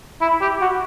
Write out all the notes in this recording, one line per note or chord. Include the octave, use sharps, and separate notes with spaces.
E4
G4
F#4